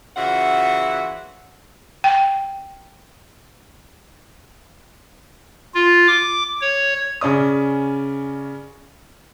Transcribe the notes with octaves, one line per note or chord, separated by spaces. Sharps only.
C#3 E3 F4 F#4 E5 F#5
G5
F4
D6
C#5
C#3 C#4 D5 D#6